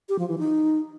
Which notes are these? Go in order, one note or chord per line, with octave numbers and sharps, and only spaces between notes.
G4
F3
E3
D#4